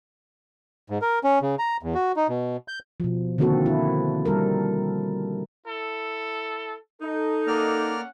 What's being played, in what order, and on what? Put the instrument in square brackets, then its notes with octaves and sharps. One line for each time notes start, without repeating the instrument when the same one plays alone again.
[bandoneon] G#2
A#4
C#4
C#3
A#5
E2
F#4
D#4
B2
G6
[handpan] B2 F3
D3 D#3 A#3 C4 F#4 A4
E4
G3 A4 A#4
[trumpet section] E4 A4
[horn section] D#4 [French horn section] A4
[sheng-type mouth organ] A#3 D5 F6 [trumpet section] C#4 F#5